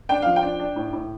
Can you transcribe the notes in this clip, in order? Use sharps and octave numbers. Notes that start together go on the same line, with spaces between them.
D4 G5
F3 F5
G5
D4
D4
A2
A2